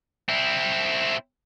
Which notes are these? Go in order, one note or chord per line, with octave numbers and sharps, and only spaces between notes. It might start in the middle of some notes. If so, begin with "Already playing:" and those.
C4 E4